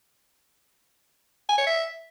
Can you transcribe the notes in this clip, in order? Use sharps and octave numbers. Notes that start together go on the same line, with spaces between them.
G#5
C#5
E5